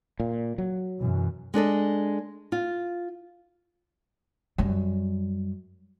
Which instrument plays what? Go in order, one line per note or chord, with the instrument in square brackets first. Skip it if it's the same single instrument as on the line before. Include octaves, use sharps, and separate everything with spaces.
[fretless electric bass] A#2
F#3
[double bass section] F#2 B2 E3
[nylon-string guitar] G#3 D4 A4 D#5
F4
[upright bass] F#2 G3